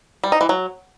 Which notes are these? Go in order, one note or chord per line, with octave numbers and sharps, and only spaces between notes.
G3
D#4
E3
F#3